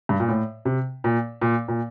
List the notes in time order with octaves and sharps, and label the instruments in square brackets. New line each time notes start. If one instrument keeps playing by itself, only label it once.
[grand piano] G2
A#2
A2
C3
A#2
A#2
A#2